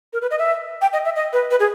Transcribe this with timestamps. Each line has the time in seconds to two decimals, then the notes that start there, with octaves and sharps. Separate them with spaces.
0.13 A#4
0.22 B4
0.31 D#5
0.39 E5
0.82 G5
0.93 D#5
1.05 E5
1.16 D#5
1.33 B4
1.51 B4
1.60 G#4